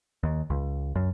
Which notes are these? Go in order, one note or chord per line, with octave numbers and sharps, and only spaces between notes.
D#2
C#2
F#2